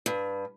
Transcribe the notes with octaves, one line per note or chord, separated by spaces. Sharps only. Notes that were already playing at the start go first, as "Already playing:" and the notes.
G2